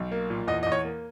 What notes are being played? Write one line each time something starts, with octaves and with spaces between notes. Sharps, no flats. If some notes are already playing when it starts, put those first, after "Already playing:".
Already playing: B1
A#3
A#2
E2 D#5
E2 D#5
C#5
A#3